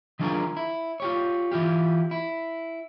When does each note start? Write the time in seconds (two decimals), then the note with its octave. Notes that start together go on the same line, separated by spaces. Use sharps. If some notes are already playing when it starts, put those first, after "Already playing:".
0.19 D#3 F#3 D4 F4 G#4 A#4
0.57 E4
1.00 F4 G4 C#5
1.52 E3 E4 F4 G4
2.11 E4